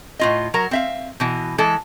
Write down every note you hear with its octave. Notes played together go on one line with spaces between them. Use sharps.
A2 F4 D#5
F#3 A#4 A#5
C4 E5 F5
B2 E3
E3 G#3 A4